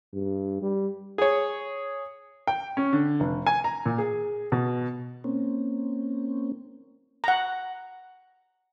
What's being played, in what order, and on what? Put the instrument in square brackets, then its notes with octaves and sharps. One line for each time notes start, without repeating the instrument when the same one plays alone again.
[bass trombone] G2
G3
[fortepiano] G#4 C#5
[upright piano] G5
C#4
D3
F1
G#5
A#5
A#2
G#4
B2
[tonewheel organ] A#3 C4 C#4
[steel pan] F#5 A#5